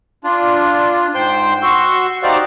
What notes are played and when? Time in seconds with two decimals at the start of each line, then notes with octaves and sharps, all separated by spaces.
0.24 D4 F4
1.15 G#2 C5 G5 C6 G6
1.62 F#4 C6 C#6 E6
2.23 D#4 F#4 G4 C5 D5 F5